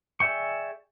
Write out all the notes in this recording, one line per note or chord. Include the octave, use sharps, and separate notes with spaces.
G#4 D5 E5 G5 C#6